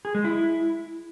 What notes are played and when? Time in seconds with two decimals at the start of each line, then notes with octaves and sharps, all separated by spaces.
0.05 G#4
0.15 G#3
0.24 E4